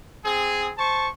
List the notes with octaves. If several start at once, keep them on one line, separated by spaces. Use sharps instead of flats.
C4 G#4
C5 A5 C#6